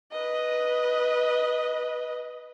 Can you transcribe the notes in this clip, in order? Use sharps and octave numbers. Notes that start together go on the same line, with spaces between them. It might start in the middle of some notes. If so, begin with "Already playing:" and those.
B4 D#5